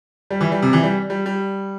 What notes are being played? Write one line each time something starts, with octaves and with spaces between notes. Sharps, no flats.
G3
E3
G3
C3
E3
G3
G3
G3